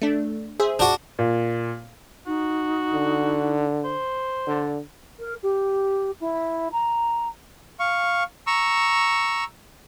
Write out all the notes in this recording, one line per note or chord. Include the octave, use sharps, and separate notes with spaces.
A3 D4
G#4 C5 E5
D4 F#4
A#2
D#4 F#4
D3
C5
D3 D5
A#4
G4
E4
A#5
F5 C#6
A#5 C#6 E6